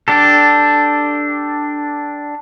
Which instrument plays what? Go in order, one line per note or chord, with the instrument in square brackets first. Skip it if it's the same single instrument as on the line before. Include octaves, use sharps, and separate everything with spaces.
[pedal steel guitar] D4 G4 A4